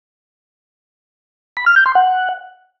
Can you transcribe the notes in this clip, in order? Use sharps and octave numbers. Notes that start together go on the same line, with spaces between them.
B5
F6
G6
C6
F#5